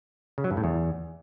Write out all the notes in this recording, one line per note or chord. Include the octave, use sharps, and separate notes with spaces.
C#3
F#3
G2
A2
E2